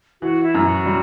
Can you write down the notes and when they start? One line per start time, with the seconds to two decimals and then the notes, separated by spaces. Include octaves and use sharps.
0.21 E3 F#4
0.43 E4
0.55 F#2 E4
0.65 F#4
0.86 G3